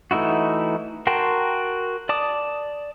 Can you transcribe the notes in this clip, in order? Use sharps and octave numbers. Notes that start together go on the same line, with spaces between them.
E3 A3 D#4 E4 F#4
F#4 A#4 G5 A5 C6
D5 A5 D6 D#6